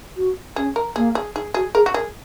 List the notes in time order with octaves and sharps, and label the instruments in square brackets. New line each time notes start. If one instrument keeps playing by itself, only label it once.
[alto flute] F#4
[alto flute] C#4 [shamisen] G#4
[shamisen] A#4
[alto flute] A#3 [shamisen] G#4
[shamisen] G#4
[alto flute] D#4 [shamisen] G#4
[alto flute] F#4 [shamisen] G#4
[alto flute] G#4 [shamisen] A#4
[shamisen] F#4
[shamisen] G#4 [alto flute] A#4